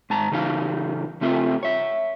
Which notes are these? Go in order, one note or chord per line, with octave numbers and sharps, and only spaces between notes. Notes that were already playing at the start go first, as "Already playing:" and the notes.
G#2 A5 A#5
C#3 E3 D#4 F#4 F5
C#3 A3 C4 F4 E5
C#5 E5